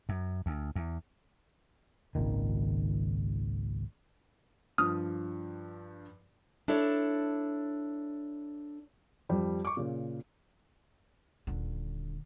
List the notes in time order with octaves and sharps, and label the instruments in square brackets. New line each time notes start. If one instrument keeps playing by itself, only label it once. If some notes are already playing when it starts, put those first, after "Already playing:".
[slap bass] F#2
D2
E2
[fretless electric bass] G#1 C#2 A#2 D#3
[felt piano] G2 F3 [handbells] D#6 F6
[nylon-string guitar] D4 E4 A4 C#5 D5
[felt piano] F2 G3
C#6 D6
A#2 C#3
[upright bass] D#1 D3